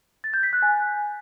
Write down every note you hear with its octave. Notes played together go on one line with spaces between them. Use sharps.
A6
G6
B6
F#6
G#5